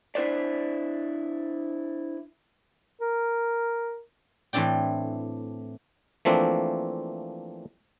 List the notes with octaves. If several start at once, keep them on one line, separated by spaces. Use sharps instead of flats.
D4 E4 B4 C5 D5
A#4
A2 E3 A3 C4 D4 G5
E3 F3 A3 A#3 C4 D4